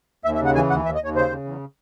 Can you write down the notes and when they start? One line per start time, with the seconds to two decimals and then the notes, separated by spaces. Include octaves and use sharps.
0.25 D#2 E5
0.35 E5
0.40 C#3
0.45 F#5
0.55 E3 G#5
0.70 D#2 F#5
0.85 D#2 E5
0.95 D#5
1.01 D#2 C#5
1.15 C#3 C5
1.30 C#3
1.45 E2